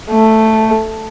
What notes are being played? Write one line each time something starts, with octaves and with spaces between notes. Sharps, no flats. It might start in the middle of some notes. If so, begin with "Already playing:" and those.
A3